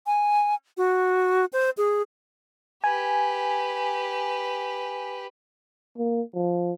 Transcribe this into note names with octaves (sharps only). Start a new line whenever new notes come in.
G#5
F#4
C5
G#4
G4 B4 G#5
A#3
F3